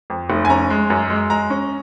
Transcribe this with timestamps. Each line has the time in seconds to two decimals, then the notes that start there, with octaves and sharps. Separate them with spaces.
0.10 F2
0.30 F1
0.45 G#5
0.50 C#4 A#5
0.70 G#3
0.90 F#2
1.10 G#3
1.30 G#3 A#5
1.50 C#4